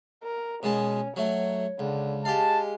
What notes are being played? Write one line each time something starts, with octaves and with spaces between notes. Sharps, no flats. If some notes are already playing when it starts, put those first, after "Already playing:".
A#4
B2 G#3 C#4 A5
F#3 A3 C#5
C#2 D3
G#3 G4 F5 A5